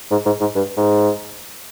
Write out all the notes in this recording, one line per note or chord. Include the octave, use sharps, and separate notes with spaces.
G#2
G#2
G#2
G2
G#2